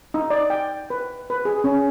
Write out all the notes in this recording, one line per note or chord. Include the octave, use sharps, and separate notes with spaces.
D#4
D5
G5
B4
B4
G#4
C#4